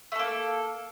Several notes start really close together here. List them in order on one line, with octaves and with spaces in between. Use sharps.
A3 A4 A#3